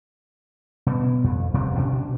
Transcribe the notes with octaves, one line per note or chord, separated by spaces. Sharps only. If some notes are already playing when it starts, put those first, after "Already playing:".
B2
F2
E1 C3 F3 C4
B2 C#4 D4